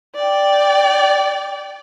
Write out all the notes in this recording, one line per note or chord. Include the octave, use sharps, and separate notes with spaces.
D5 G5